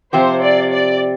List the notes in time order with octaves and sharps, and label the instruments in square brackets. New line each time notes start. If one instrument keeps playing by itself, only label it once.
[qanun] C3 F3 C4 G4 [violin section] C5
[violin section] D5
D5